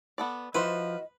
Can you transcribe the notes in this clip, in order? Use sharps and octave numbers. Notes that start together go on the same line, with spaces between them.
B3 A4 D5
F3 E4 F#4 B4 C5 D#5